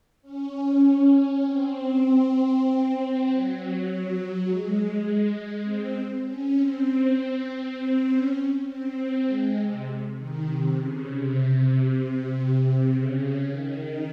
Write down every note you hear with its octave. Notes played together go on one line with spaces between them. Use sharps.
C#4
C4
F#3
G#3
C4
C#4
C4
C#4
C4
G#3
C3
D#3
C3
C#3
C3
C#3
D#3